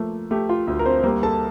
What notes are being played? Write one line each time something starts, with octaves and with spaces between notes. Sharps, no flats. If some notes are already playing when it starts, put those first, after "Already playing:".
Already playing: F3 A3 A#3
A3 G4
F4
D2
A#4
C4 C5
G3 A#3 A#4
A4 A5